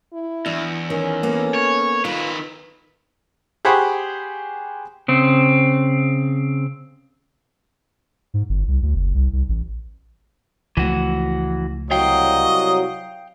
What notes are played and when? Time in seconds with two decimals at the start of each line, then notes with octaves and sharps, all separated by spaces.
0.13 E4
0.46 E2 D4
0.90 D#3 C#4
1.23 A#3 B3 A4
1.54 C#5
2.05 D#3 F4 B4
3.65 G4 G#4 C5 F#5 B5 C#6
5.08 C#3 C4
8.34 G#2
8.49 G1
8.68 C2
8.82 D2
8.95 F#1
9.14 C2
9.33 C2
9.49 A1
10.77 C#2 E3 F3 A3 F#4
11.91 C2 F#3 D#5 F5 G5